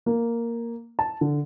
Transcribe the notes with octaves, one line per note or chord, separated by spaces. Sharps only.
A#3
A5
D3